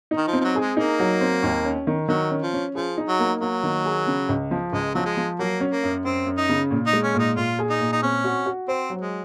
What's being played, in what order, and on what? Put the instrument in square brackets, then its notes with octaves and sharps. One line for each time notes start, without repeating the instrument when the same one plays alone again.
[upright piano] D#4
[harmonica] D#3
F3
[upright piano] C4
[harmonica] F3
F#3
[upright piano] G#4
[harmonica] G#3
[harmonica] A#3 [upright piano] D#4
[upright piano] F#3
C4
D#2
C#4
D#3
[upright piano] D#3 [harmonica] F#3
[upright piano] C#4
[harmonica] F3
[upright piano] C#4
[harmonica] F3 [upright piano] G#4
[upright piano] D#4
[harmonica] F#3
[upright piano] A#3
[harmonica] F#3 [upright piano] A#3
[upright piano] D#3
G#4
C#3
C#2
F3
[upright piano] C#2 [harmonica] G#3
[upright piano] F3 [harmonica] F#3
[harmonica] G#3
[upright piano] F3
[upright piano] F#3 [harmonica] A#3
[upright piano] C#4
[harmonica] A#3
[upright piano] F#2
[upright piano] F#2 [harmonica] C4
[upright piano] F#2
[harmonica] D#4
[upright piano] C#3
A#2
[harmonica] D#4
[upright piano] G#3
[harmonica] C#4
[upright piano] A#2 [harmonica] D#4
[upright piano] A#2 [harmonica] F4
[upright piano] G#4
[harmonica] D#4
[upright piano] A#2
[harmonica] D#4
[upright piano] C4 [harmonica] C#4
[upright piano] F#4
F#4
[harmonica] C4 [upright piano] C5
[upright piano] F#3
[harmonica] G#3